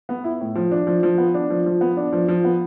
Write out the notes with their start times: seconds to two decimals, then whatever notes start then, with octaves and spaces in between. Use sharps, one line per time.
0.09 B3
0.24 E4
0.40 A2
0.55 F3
0.72 D4
0.87 F3
1.03 F3
1.18 B3
1.34 D4
1.50 F3
1.66 F3
1.81 B3
1.97 D4
2.12 F3
2.28 F3
2.44 B3